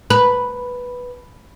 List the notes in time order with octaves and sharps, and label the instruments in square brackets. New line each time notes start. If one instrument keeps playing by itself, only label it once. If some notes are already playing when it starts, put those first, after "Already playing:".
[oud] B4